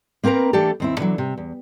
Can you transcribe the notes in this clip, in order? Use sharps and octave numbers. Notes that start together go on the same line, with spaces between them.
A#3 C4 A#4 B4 A#5
E3 A3 A#3 D4 G4 A4
D#2 C4 E4
D3 E3 F#3
C3
E2